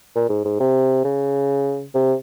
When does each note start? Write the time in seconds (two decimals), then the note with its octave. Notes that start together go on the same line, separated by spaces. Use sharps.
0.15 A#2
0.29 G#2
0.45 G#2
0.60 C3
1.04 C#3
1.94 C3